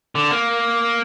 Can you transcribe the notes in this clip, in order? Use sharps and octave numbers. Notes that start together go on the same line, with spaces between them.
D3
A#3